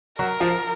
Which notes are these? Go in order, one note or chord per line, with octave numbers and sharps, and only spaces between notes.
F#3 F#4 A#4
F3 F4